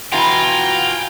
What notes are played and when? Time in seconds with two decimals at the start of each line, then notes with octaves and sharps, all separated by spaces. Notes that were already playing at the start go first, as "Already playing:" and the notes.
0.12 B2 E3 F4 F#4 G5 G#5 A#5